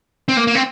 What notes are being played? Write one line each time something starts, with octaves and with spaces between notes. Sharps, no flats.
C4
A#3
A#3
C4